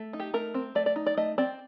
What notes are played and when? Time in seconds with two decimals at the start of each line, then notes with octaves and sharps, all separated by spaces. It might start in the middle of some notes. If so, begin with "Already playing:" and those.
Already playing: A3
0.13 D#4
0.20 G4
0.34 A3 A#4
0.54 C4
0.75 A3 D5
0.86 D5
0.96 D#4
1.06 D5
1.17 A3 D#5
1.38 C4 D5